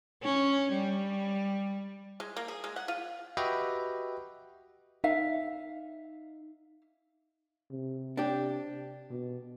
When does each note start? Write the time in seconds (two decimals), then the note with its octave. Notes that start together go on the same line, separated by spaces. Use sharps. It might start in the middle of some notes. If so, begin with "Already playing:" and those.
0.23 C#4
0.72 G3
2.20 G#3
2.36 A#3
2.48 G#4
2.64 G#3
2.76 F#5
2.88 F4
3.37 F#4 G4 B4 D#5 E5 G5
5.04 D#4 E5 F5
7.71 C3
8.17 D4 G4
9.11 B2